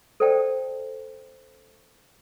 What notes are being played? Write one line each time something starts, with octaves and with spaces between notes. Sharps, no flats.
A4 C5 D5 D#5 G5 A5